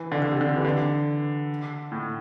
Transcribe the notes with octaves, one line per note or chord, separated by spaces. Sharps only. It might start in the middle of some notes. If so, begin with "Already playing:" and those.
Already playing: E3
D3
D3
C3
D3
E3
D3
A2